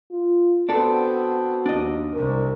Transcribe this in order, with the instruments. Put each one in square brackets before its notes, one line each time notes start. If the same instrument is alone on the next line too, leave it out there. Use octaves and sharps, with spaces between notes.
[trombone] F4
[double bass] B3 C4 [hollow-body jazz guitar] D4 A4 [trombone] F#4
[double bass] D#2 [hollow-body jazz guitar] D4 D#5
[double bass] C2 C3 [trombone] A#4